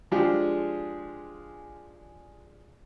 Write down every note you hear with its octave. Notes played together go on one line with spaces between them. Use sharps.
F3 G#3 D4 F4 G4 G#4